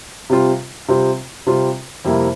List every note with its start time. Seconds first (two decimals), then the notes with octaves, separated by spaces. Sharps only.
0.30 C3 G3 C4 F4
0.88 C3 G3 C4 F4
1.46 C3 G3 C4 F4
2.05 F2 C3 G3 A#3 E4